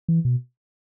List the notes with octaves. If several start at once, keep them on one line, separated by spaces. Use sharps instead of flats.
E3
B2